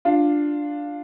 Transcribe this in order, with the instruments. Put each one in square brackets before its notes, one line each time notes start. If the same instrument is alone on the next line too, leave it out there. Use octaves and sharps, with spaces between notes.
[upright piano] D4 F4